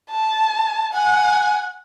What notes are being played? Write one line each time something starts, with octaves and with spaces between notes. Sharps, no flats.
A5
F#5 G#5